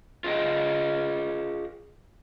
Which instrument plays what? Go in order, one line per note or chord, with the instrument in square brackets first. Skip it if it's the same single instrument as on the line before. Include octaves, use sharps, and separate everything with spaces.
[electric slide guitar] F4 G#4 D#5 G5